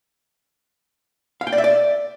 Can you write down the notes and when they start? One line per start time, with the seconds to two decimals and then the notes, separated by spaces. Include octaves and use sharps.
1.41 F5
1.47 G5
1.53 D5
1.58 E5
1.64 D5